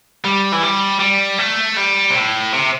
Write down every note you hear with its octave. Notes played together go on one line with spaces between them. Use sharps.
G3
E3
G3
G3
A3
G3
C3
A2
C3